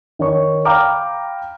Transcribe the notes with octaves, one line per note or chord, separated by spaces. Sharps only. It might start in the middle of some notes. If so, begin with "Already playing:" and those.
D#3 C#5 C#6
F5 G5 A#5 B5 D6 F6